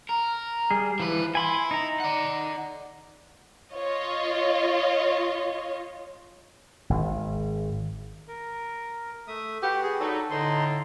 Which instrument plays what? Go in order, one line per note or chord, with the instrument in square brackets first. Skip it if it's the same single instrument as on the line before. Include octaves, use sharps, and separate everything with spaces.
[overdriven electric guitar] A#4
[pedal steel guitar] G3 G#4
[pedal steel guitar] E3 [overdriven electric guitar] F3 B4
[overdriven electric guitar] E4 [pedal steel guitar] G#5 B5 C6
[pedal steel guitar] D#4 A#5
[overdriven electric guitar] D5 F#5
[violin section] F4 C#5 D#5
[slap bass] G#1
[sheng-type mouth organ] A#4
A3 E5 D#6
[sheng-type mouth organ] F#4 B4 F#5 [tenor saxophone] G4
[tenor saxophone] G#4
[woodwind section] F#3 D4 D#4 [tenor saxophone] A4
[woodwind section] A2 D3 [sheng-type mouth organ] D#4 C6